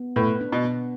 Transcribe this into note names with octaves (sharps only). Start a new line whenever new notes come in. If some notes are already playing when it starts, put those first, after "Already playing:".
Already playing: B3
A2 B4
D4
B2
B3